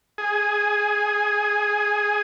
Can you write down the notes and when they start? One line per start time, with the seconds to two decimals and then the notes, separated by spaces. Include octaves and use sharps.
0.18 G#4